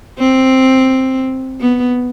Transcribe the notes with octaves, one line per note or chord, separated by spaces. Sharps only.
C4
B3